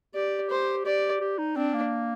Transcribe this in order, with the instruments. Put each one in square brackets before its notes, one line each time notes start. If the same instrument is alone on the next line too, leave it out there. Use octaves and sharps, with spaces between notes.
[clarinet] G4 [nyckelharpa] D5
[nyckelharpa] C5
[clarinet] G4 [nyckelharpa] D5
[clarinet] G4
D#4
[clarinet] C4 [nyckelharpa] D4
[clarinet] A#3